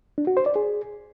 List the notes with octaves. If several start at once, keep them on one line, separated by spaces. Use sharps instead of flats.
D4
F#4
C5
D5
G#4